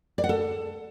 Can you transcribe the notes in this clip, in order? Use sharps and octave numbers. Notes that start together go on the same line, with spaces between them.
D5
F#5
A4